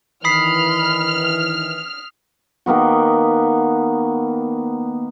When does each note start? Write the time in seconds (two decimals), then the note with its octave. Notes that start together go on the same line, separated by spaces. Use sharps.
0.25 D#3 E3 B5 D#6 F6 B6 C7
2.66 D#3 A#3 B3 F#4